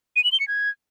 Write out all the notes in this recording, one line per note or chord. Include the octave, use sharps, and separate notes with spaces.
D#7
F#7
G7
C#7
G#6